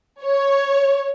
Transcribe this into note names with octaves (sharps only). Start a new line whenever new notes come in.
C#5